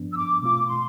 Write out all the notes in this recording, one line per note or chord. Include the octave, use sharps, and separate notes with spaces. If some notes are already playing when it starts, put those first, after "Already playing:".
Already playing: G2 F3 B3 D4
E6
D6
B2 A3 C4 F4 D6
C6